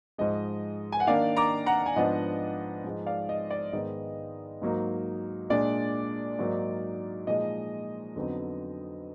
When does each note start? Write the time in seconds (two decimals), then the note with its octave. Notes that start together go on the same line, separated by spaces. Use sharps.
0.18 G#2 F3 G#3 D#5
0.92 G#5
1.00 F#5
1.07 D#3 A#3 D4 D5 F5
1.37 A#5 D6
1.66 F#5 A#5
1.86 G#5
1.96 G#2 F3 B3 D4 D#5 F#5
2.84 G#2 F3 G#3 D#4
3.06 D5 F5
3.29 D#5
3.50 D5
3.73 G#2 D#3 G#3 B3 D#4 D#5
4.62 G#2 F#3 A#3 D#4
5.50 A#2 G#3 D4 D5
6.39 G#2 F#3 A#3 D#4
7.27 A#2 F3 G#3 D#4 D#5
8.16 F2 D3 F#3 B3 D#4